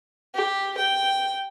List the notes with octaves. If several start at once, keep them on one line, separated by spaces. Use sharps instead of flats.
G4
G5